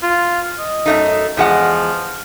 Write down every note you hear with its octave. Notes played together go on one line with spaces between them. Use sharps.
F4
D#5
F#2 A3 D#4
E2 F3 G#3 F#5